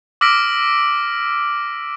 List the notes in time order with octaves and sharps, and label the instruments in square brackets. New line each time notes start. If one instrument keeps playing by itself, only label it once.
[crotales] D6 E6 F6 A#6 B6 D7